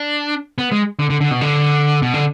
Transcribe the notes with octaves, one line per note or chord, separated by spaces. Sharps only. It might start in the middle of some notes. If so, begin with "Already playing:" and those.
Already playing: D4
B3
G#3
D3
D3
D3
B2
D3
B2
D3